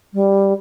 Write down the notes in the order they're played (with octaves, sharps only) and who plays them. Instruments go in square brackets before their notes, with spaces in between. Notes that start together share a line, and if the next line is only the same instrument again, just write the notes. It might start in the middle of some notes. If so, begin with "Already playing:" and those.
[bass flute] G3